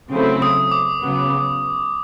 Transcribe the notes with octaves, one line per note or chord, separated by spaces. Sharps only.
C#3 F#3 A3 C4 E4
D#6
D6
C#3 F#3 B3